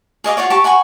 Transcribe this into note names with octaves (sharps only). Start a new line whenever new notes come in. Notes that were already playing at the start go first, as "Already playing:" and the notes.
G#4 D#5 F5 D6
F4 F#4 C#5 D5
G4 A5 C#6
F#5 G#5 B5 C#6